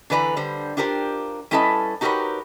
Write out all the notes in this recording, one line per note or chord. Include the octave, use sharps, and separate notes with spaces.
D3 E3 B4 D5 A#5
D3 G3 C5
D4 F4 G4 A#4 C5
G3 C#4 E4 A4 B4 D#5
D#4 F#4 G4 A#4 B4 C#5